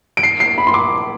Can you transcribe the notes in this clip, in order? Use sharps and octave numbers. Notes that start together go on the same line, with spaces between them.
D7
C7
C7
B5
C6
D6